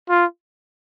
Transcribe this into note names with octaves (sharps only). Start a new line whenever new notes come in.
F4